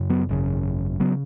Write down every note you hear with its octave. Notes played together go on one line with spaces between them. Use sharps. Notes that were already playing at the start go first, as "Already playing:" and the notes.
Already playing: F#2 C#3
F#3 B3
G#1 F#2 C#3
C#3 F#3 B3